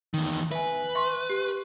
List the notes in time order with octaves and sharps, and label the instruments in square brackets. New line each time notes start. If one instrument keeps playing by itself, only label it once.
[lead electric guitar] E2 D#3
[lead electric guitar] B4 [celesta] E5 G#5
[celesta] E5 C6 C#6
G4